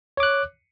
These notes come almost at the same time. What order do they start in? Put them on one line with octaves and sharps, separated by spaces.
C#5 D6 F#6